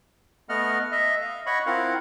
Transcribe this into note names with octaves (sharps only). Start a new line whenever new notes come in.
A3 B3 D#5 F#5 F6
D#5 E5
F5
C#5 D#5 F#5 B5 C#6
C4 E4 F4 A#4 F5 F#5